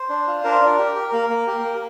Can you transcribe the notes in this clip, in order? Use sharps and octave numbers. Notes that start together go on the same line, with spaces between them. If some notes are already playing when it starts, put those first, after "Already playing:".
Already playing: C5
D4
F4
D4 A#4
D4
G4
G4
A#3
A#3
G4
A#3